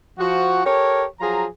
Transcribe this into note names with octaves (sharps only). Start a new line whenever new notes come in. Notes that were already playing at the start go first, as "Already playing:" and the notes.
F3 F#4
G4 A4 A#4 C#5
F3 F#3 F4 G#4 A#5